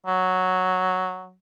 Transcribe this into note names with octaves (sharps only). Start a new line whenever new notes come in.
F#3